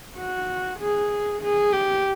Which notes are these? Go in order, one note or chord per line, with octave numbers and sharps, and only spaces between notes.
F#4
G#4
G#4
G4